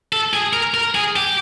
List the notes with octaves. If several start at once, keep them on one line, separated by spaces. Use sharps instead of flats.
A4
G#4
A#4
A#4
G#4
G4